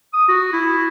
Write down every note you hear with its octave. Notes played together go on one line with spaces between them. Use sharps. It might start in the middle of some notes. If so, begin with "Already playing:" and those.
D#6
F#4
E4